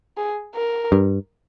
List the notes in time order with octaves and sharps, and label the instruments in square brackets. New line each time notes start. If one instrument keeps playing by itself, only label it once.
[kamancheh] G#4
A#4
[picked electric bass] G2